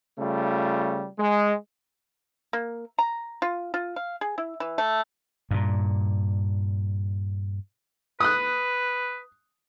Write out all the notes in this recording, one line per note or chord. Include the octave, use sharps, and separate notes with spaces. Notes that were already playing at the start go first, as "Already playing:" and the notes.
C#3 G3 A3 F4
G#3
A#3
A#5
F4
F4
F5
G#4
E4
E3
A3
G2 A#2
B4 D#6 F#6